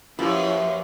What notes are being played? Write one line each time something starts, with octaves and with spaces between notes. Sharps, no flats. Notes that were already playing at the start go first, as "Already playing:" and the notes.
F#2 F3 A#3 E4 F4 G4 B4 C#5